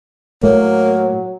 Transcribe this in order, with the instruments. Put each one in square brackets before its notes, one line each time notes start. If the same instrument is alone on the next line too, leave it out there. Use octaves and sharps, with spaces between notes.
[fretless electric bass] A2 A3 [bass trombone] F#3 [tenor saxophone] A#3 [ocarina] C#5